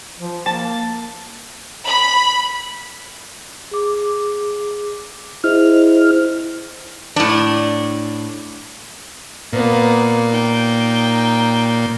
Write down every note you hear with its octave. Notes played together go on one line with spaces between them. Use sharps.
F3
A#3 A5
B5
G#4 D6
E4 G#4 C5 D#5 F6
A2 D4
A#2 A#3 B3
D#4 G5